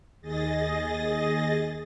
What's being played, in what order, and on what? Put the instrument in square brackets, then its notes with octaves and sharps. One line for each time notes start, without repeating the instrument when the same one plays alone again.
[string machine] D#2 G#4 D#5 A6 A#6